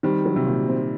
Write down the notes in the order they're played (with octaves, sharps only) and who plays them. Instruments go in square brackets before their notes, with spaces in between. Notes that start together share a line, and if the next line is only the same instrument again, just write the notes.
[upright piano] D#3 G3 [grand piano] C4
[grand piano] F#3
[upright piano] C3 D#3
[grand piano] A#2
C4